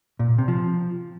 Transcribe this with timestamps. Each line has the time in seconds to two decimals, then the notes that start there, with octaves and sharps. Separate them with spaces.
0.19 A#2
0.38 C3
0.48 F3